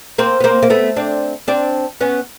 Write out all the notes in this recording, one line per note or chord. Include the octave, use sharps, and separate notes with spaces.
A#3 C4
B3
A#3 C4
A#3
A3 B3
C4 D4
C4 D4
B3 C#4